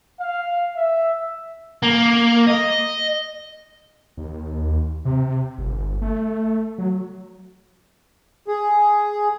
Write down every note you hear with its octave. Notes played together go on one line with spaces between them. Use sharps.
F5
E5
A#3
D#5
D#2
C3
G1
A3
F#3
G#4